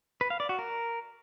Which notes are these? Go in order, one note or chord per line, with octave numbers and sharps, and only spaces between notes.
B4
F5
D5
F#4
A#4